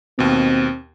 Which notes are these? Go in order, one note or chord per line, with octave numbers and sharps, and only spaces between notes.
D#2 B2 C4